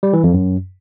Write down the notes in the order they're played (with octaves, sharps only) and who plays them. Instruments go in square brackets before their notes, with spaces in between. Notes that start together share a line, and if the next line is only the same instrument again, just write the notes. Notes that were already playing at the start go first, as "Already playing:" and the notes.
[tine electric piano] G3
E3
F2
F#2